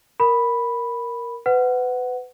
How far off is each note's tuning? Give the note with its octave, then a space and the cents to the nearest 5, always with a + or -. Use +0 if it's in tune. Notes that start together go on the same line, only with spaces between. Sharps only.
A#4 +0 B5 +0
B4 +30 F#5 +5